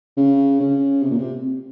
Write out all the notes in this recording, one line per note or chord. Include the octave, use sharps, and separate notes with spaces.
C#3
C#3
C3
A#2
C3